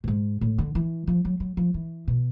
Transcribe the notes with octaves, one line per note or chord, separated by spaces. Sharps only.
A2
G#2
A2
D3
E3
F3
F#3
F#3
F3
E3
B2